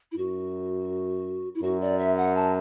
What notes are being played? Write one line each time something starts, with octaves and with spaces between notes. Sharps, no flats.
E4
F#2 F#4
E4
F#2 F#4
D5
E5
F#5
A5